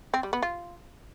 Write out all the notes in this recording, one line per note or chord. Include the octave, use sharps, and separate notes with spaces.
C4
G3
B3
F4